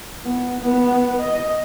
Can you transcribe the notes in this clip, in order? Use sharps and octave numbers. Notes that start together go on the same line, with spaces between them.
B3
B3 B4
D#5